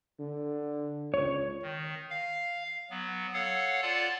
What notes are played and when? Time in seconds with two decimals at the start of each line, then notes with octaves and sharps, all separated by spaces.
0.19 D3
1.14 C#2 C#5
1.62 D#3
2.10 F5
2.90 F#3 B3
3.34 A4 C#5 F5 F#5
3.82 F4 D5 F#5 A5